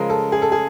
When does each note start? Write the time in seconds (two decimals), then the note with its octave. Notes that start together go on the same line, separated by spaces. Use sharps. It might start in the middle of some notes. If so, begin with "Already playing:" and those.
Already playing: C#3 F3 G#3 A#4
0.10 A4
0.32 G#4
0.42 A4
0.52 G#4